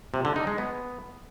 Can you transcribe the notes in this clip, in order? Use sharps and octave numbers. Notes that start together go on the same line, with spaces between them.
C3
D3
D#4
G#3
B3